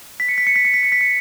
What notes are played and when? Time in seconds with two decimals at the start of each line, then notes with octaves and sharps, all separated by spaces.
0.20 B6
0.29 C#7
0.38 B6
0.47 C#7
0.56 B6
0.65 C#7
0.74 B6
0.83 C#7
0.92 B6
1.01 C#7